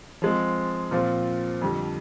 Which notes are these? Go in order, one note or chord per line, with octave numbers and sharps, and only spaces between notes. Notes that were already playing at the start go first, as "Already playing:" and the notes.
F3 G#3 C4
A#2 F3 C4 F4
F2 D3 G3